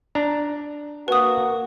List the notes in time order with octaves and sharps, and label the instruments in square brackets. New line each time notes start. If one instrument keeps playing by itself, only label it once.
[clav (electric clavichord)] D4 A#5
[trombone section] A#3 F#4 [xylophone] B4 D#6